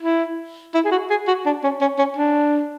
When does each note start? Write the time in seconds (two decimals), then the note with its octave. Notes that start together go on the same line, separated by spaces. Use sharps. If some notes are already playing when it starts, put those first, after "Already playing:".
0.03 E4
0.75 E4
0.85 G#4
0.92 F#4
1.10 G#4
1.28 F#4
1.46 D4
1.64 C#4
1.81 C#4
1.99 C#4
2.17 D4